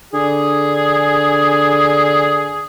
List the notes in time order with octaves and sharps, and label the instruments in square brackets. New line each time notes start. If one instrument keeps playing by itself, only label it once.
[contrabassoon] D3 [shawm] G#4